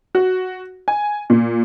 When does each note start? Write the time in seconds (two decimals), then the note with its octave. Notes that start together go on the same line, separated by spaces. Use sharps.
0.15 F#4
0.88 G#5
1.30 A#2